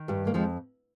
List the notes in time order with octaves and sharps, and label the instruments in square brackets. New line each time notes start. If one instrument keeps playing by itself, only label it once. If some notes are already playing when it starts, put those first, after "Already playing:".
Already playing: [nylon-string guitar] D#3
G2 G3
A#3
F2 F3 G#3